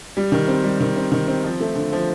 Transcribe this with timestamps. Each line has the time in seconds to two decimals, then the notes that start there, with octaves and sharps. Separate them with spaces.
0.17 G3
0.32 D#3
0.48 C4
0.64 G3
0.80 D#3
0.96 C4
1.12 D#3
1.28 C4
1.44 F3
1.60 A3
1.75 D3
1.93 F3